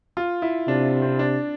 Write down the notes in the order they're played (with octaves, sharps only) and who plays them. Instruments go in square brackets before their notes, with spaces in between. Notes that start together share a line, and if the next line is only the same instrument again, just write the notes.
[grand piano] F4
E4
[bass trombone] C3 [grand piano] D4
[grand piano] C4
D4